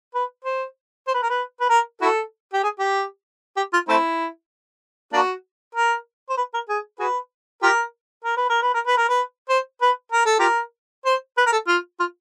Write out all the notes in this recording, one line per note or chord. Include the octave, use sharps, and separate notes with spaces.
B4
C5
C5
B4
A#4
B4
B4
A#4
E4 F#4 A4
G4
G#4
G4
G4
F4
A3 C4 E4
A#3 D4 F#4
A#4
C5
B4
A#4
G#4
F#4 G#4 B4
F4 G4 A#4
A#4
B4
A#4
B4
A#4
B4
A#4
B4
C5
B4
A#4
A4
F4 G4 A#4
C5
B4
A#4
A4
F4
F4